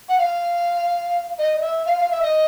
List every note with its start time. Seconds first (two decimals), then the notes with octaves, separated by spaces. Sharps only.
0.09 F#5
0.18 F5
1.39 D#5
1.58 D#5
1.62 E5
1.86 F5
1.98 F5
2.11 E5
2.22 D#5